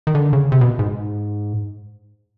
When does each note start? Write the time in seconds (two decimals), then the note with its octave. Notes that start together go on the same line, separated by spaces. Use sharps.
0.07 D#3
0.15 D3
0.33 C#3
0.52 C3
0.61 B2
0.79 G#2